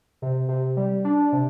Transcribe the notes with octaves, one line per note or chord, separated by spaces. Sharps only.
C3
C3
G3
D4
C3